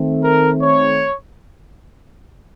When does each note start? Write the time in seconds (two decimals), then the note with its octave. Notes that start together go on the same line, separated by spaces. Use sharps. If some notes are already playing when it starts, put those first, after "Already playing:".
Already playing: D#3 A3 C4
0.24 A#4
0.61 C#5